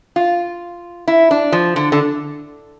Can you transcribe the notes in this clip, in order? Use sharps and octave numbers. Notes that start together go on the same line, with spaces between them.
F4
E4
D4
F3
D3
D3